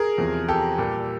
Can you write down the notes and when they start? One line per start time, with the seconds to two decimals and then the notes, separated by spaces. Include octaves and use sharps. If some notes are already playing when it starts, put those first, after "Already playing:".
Already playing: G#4 A#4
0.18 E2 C3 F3
0.48 G4 A4
0.78 A#2 G3